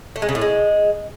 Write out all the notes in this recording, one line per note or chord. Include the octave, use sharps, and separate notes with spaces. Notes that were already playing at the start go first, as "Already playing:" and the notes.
A3
G#3
C#3
A2
G#3